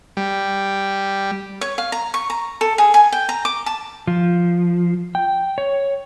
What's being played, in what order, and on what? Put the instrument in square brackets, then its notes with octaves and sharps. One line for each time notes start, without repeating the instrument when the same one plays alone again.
[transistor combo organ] G3
[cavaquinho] C#5
F5
A#5
C#6
A#5
A4
G#4
G#5
G5
A#5
D6
A5
[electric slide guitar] F3
G5
C#5